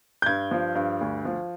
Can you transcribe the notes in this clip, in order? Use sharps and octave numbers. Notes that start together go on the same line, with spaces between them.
G6
G2 G#6
F3
G2
D2
F3